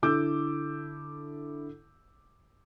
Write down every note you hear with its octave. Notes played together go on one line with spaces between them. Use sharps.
D3 E4 A4 D6 E6 G6